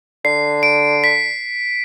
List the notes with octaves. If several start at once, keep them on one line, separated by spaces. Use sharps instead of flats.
D3 C7
D7
B6